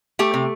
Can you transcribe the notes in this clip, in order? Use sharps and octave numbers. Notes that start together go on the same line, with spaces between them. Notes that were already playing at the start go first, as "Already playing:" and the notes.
A3 G4
C3